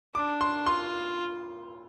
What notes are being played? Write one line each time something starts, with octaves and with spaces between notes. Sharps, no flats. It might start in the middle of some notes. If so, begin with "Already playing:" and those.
D4 D6
C6
F4 C6